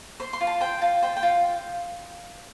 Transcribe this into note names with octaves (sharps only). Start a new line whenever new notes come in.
C5 C6
C6
F4
A5
C5 G5
F4 A5
C5 G5
G5
F4